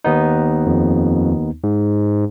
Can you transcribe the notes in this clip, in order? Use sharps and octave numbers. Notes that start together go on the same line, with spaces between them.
D#2 B3 D#4
F2
G#2